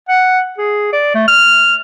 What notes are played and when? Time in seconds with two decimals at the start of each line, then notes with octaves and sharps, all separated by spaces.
0.09 F#5
0.58 G#4
0.93 D5
1.15 A3
1.28 F6